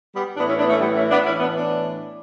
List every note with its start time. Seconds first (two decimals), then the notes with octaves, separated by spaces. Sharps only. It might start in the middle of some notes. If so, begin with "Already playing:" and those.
0.14 G3 B3
0.36 A2 E3 B3 D4
0.49 C#4 E4
0.59 B3 D4
0.70 A3 C#4
0.81 G3 B3
0.96 C#4 E4
1.10 B3 D4
1.25 E3 C#4 E4
1.30 A2
1.40 B3 D4
1.55 B3 D4